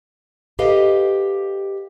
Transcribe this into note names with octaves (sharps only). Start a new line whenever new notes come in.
G4 A4 B4 D#5 F5